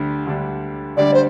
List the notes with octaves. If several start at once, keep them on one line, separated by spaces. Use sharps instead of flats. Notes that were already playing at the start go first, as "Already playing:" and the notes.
Already playing: D2 D3 G3
D2 D3 G3 D4
D2 D3 G3 D4 D5
C5